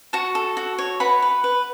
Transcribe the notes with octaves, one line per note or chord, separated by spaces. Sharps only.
F#4 A5 C#6
A4
F#4
C#5
B4 F#5 B5
B4
B4